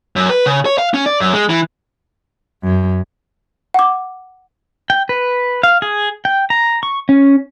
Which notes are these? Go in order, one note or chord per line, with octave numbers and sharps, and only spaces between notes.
F#2
B4
C#3
C#5
F5
C#4
D5
F#2
G#3
E3
F#2
F#5 D6
G5
B4
F5
G#4
G5
A#5
C#6
C#4